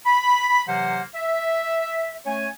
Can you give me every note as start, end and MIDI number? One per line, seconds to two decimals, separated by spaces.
0.06 0.66 83
0.67 1.02 48
0.67 1.02 52
0.67 1.02 54
0.67 1.02 58
0.67 1.02 72
0.67 1.02 78
1.15 2.17 76
2.26 2.48 57
2.26 2.48 61
2.26 2.48 73
2.26 2.48 80